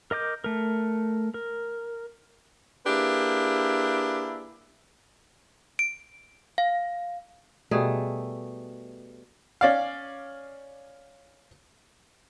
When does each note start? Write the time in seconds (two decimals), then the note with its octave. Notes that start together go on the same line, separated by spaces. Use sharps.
0.11 A#4 D#5 D6 G6
0.44 A3 A#4
1.34 A#4
2.86 A#3 D4 E4 G4 G#4 B4
5.79 D7
6.58 F5
7.71 B2 G3 A3 G#4
9.61 C#4 D5 F5